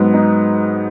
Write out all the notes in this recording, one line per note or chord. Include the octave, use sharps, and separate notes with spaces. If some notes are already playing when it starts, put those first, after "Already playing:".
Already playing: G#2 F#3 B3
D#4